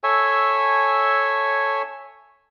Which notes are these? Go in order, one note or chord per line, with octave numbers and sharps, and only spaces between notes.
A4 C#5 E5 G#5